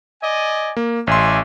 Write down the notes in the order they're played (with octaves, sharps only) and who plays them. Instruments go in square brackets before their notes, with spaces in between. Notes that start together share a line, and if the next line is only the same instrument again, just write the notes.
[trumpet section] D5 D#5 G#5
[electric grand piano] A#3
[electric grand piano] A1 C6 [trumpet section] D5 E5 G#5